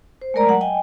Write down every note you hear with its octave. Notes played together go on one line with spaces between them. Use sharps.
C5
G#3 A3 A#4 D5 A#5
F#3 F#5
D#5 G5 G#5